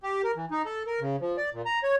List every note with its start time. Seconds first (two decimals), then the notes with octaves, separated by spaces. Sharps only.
0.03 G4
0.24 A#4
0.36 E3
0.51 D#4
0.66 A4
0.87 A#4
1.01 C#3
1.21 F3
1.37 D5
1.53 A#2
1.66 A#5
1.83 C#5